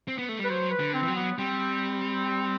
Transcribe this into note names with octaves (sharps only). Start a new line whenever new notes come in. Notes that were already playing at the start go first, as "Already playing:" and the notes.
C4
B3
A3
G3
B4
F#3 C5
B4
D3
C4
E3
F#3
B3
G3 C4